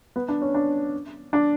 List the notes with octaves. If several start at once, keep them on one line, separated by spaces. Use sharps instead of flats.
B3
D4
C#4
D4
D4